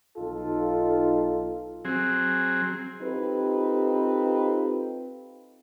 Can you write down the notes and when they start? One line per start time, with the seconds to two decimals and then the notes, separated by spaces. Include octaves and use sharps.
0.17 B1 D#4 F4 A4
1.85 F#3 C4 G#4
3.02 C4 D#4 F4 G4 A4 B4